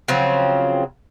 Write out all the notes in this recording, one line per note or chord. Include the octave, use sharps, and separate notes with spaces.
C#3 F3 F#3 C4